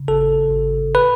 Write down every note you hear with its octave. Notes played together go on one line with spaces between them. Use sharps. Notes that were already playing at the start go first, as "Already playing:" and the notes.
Already playing: C#3
G#1 A4
G#1
B4